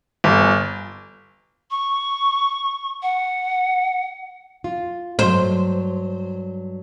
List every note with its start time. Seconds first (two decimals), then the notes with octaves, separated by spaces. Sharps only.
0.24 G1
1.71 C#6
3.02 F#5
4.64 F4
5.19 G2 F#3 C5